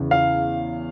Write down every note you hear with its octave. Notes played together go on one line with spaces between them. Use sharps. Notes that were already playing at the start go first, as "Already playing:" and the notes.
Already playing: E2 C#3
F5